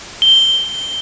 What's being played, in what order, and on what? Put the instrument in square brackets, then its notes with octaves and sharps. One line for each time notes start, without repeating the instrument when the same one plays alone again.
[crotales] G7